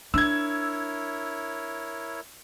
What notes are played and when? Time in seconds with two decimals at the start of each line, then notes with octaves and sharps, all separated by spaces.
0.14 D4 E4 A#4 C#5 E6 G#6